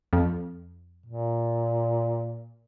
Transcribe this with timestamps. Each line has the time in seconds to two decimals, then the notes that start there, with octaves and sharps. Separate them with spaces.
0.13 F2
1.06 A#2